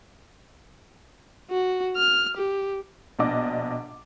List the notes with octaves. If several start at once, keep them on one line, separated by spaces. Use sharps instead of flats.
F#4
F6
G4
A#1 B2 D4 D#5 D6